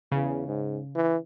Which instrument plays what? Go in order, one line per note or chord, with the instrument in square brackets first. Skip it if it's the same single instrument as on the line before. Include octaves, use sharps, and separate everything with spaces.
[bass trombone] E2 [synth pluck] C#3
[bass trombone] G#2
E3